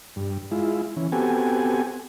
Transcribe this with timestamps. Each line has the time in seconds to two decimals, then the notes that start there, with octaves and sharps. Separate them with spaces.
0.16 G2
0.51 G#3 E4 F4
0.96 E3 C#4
1.12 B3 C4 F#4 G4 A4 G#5